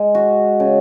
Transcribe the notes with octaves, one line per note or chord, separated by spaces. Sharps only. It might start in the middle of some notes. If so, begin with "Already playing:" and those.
Already playing: G#3
F#4
C#3